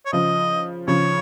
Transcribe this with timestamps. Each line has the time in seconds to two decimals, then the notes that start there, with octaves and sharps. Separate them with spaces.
0.06 C#5
0.13 C#3 F3 D#5
0.88 C#3 F3 C#5